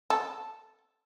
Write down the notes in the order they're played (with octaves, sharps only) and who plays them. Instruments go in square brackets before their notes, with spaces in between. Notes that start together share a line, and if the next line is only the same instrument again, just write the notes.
[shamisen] A4